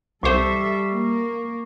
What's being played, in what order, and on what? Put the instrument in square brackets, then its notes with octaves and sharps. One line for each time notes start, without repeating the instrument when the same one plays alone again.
[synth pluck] C2 C5 [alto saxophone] G3 [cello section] A4 E5 [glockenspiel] C#6 D6 C7
[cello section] A#3